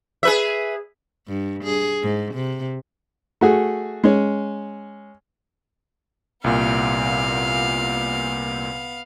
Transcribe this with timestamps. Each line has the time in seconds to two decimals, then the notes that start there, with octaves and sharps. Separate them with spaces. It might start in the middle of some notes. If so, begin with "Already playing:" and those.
0.23 G#4 B4 E5
1.28 G2
1.64 G#4
2.02 G#2
2.34 C3
3.41 A3 F#4 G#4
4.04 G#3 C#4
6.44 C2 A#2 B3 F5